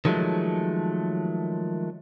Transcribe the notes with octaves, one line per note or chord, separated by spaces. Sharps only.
D#3 F3 F#3 G#3 A3